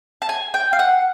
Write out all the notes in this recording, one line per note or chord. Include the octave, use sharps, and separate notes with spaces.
A5
G#5
G5
F5
F#5